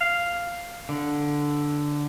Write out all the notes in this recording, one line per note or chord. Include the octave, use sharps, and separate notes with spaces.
F5
D3